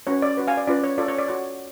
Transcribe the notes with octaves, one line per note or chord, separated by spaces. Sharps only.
C#4 F#4 B4 C#5
D5
F#4 B4
F5 G#5
D5
C#4 F4 B4 D5
C#5
F4 A4 C#5 D5
C#5
D5
F#4 C#5